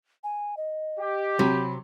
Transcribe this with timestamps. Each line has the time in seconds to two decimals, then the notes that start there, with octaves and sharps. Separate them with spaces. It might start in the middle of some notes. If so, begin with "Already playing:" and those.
0.24 G#5
0.57 D#5
0.99 G4
1.39 C3 F#3 B5